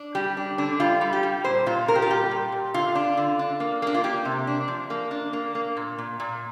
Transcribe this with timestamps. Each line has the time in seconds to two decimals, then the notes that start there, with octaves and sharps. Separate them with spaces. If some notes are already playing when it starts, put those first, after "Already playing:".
Already playing: D4
0.15 G3 G4
0.37 D4
0.58 D3 D4
0.80 G3 F4
1.01 G3
1.13 G4
1.23 G3
1.44 A#2 C5
1.66 A#2 F4
1.88 A#2 A#4
1.95 G4
2.02 F4
2.10 G3 G4
2.31 A#2
2.52 A#2
2.74 D3 F4
2.95 D4
3.17 D3
3.39 D4
3.60 A#3
3.82 A#3 D4
3.94 F4
4.03 A#3 G4
4.25 C3
4.47 D4
4.68 F3
4.90 A#3
5.11 D4
5.33 A#3
5.55 A#3
5.77 A#2
5.98 A#2
6.20 A#2